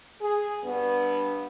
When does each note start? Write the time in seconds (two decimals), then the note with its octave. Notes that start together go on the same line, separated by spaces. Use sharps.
0.21 G#4
0.64 G2 B3